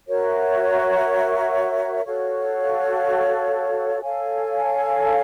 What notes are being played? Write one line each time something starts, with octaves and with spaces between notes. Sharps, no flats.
F#4 A#4 C#5 E5
F#4 A4 C#5 F5
A4 C#5 F5 G#5